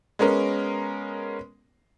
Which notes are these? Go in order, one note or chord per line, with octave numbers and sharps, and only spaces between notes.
G#3 B3 C#4 A#4